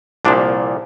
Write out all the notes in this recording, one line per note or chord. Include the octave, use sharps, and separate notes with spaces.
C2 A#2 F3 D4